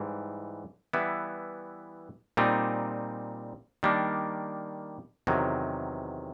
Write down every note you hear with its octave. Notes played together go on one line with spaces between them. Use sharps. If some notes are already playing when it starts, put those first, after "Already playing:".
Already playing: G#2 E3 G3
E3 G3 B3 E4
A#2 G3 C4 D#4
D#3 G3 A#3 D4
E2 C3 D#3 F#3